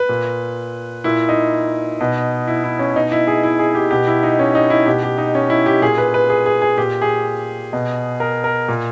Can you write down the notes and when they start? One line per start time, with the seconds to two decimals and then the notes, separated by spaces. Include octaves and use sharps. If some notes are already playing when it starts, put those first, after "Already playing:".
Already playing: B4
0.09 A#2
1.04 A#2 E4
1.29 D#4
2.01 B2
2.48 E4
2.64 E4
2.79 C#4
2.95 B2 D#4
3.12 E4
3.27 G#4
3.43 E4
3.59 G#4
3.75 G4
3.91 B2 G4
4.07 E4
4.23 D#4
4.39 C#4
4.55 D#4
4.70 E4
4.86 B2 G4
5.03 G4
5.18 D#4
5.35 C#4
5.50 E4
5.66 G4
5.82 A#2 G#4
5.98 B4
6.14 B4
6.30 G#4
6.46 G#4
6.62 G#4
6.77 A#2 G4
7.02 G#4
7.73 B2
8.20 A#4
8.44 A#4
8.68 A#2